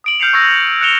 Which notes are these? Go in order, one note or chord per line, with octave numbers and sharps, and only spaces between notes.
D#6 D7 F#7
F6 G6 C7 C#7 F7
C#6 E6 F6 G#6 A#6 C7
F#6 G#6 C#7 E7 F7 G7